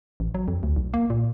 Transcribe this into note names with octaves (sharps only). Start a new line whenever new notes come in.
A1
F#3
F2
D2
B1
A#3
A#2